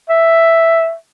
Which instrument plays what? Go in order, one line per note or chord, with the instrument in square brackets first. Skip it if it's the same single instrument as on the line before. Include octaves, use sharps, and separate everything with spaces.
[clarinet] E5